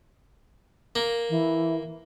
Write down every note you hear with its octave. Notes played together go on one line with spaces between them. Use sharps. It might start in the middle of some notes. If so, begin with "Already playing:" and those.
A#3
E3